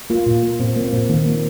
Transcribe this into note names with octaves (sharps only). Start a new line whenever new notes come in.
A#3 F4
A#2
A#3
A#2 C4
A#3
C4
A#2
D#3 A#3
A#3